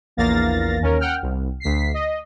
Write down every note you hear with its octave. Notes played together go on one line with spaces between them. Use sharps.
A#1 E2 A#3 F5 A6 A#6
D#2 C#4 A#4
F#5 G5 F6
C2
D2 B6 C7
D#5